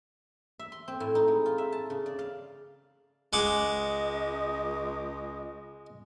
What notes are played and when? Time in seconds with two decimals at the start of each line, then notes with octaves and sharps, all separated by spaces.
0.59 E5
0.72 C6
0.88 C4
1.00 A2
1.15 D#4
1.28 G#3
1.46 F4
1.58 E5
1.72 A5
1.90 C#3
2.06 D5
2.19 F5
3.33 C#2 G#3 D#5 F#5 D6